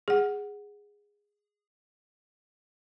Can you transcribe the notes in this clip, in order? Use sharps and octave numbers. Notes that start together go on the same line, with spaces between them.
G#4 F#5